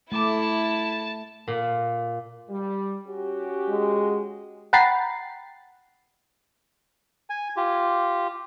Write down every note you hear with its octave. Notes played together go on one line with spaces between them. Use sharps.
A3 E4 G5 A5 D6
A#2
G3
C#4 F#4 G4
G#3
F#5 G5 A#5 B5 A6 C7
G#5
F4 G4